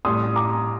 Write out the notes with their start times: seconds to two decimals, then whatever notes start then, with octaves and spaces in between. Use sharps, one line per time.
0.05 A1 A2 G3 C6 D#6
0.36 A#5 D6